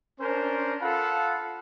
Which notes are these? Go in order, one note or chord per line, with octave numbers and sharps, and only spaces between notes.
C#4 D4 A#4 C5
F4 A4 F5 F#5 B5